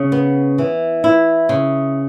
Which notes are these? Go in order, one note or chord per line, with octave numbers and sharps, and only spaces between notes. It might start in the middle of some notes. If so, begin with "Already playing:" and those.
Already playing: C#3
B3
E3
E4
C#3